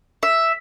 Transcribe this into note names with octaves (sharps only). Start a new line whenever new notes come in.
E5